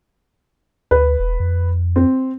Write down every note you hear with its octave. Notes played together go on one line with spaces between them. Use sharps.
D2 B4
E1
F2
C4